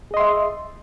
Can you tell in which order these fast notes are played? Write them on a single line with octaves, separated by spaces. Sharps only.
G#4 D#5 C6 E5